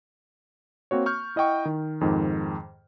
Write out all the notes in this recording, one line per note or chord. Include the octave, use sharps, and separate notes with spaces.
A#3 C4 F#4 C#5
C#6 F6 G6
E4 D#5 F#5 G5 C#6
D#3
F2 G#2 D#3